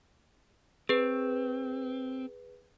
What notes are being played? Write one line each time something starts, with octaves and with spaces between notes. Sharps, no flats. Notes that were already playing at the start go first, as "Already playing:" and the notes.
C4 G#4 B4